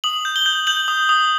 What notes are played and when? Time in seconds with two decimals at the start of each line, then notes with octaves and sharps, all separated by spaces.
0.04 D#6 F#7
0.25 G6
0.36 G7
0.46 G6
0.67 G6 F#7
0.88 D#6
1.09 D#6